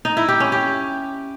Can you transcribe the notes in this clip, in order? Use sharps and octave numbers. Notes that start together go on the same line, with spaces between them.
D#4
E4
G4
C#4
G4